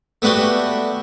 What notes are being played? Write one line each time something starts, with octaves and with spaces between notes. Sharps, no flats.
A3 B3 D4 F#4 G4